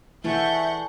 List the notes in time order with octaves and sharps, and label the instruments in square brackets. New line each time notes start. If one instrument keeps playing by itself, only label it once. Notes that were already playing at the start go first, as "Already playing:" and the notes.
[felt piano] E3 [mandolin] A3 D4 G#4 [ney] E5 [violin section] F#5 C#6 G6